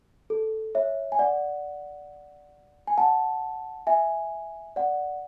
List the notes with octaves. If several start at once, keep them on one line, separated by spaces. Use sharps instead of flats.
A4
C#5 E5
G#5
D5 F#5
G#5
F#5 A5
E5 G#5
D5 F#5